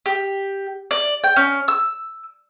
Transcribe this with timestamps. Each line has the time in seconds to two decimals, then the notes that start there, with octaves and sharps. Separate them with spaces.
0.06 G4
0.91 D5
1.24 G5
1.36 C#4
1.68 E6